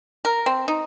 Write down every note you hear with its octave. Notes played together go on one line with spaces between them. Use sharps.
A#4
C4
D#4